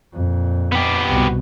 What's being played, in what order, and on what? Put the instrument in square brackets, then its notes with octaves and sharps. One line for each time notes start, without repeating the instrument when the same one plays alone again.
[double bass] F2 A#2
[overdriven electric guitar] B3 G4
[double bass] C2 B2